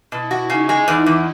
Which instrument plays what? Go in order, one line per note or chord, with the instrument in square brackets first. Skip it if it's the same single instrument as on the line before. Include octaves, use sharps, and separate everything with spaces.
[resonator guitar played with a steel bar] B2 [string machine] E4
[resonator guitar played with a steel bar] F#4
[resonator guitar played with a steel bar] C#3 [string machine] D#4
[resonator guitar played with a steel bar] G#3
E2
E2